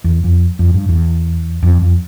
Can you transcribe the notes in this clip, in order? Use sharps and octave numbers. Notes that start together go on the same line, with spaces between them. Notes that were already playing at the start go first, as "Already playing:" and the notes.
E2
F2
F2
G2
E2
F2
F2